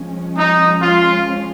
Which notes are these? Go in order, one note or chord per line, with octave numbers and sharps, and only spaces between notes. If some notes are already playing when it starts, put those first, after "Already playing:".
Already playing: F3 G#3 C#4
D#4
F4